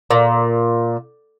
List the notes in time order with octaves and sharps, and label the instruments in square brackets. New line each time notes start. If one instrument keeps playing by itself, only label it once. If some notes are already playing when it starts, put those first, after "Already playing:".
[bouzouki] A#2